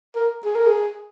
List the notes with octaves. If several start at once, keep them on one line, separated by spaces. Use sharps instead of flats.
A#4
G#4
A#4
G#4